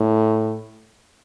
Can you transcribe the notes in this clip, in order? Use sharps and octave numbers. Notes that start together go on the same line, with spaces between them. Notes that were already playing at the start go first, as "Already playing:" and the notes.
Already playing: A2